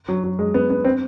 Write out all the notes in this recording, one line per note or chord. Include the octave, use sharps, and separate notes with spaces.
F#3
F#3
G#3
B3
B3
C4